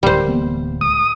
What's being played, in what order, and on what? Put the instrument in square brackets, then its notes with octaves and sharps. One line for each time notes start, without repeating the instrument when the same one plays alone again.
[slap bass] D1 [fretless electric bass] C#2 A2 [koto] G3 C5
[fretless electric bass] E3 A#3 B3
[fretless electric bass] C#2 [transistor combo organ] D#6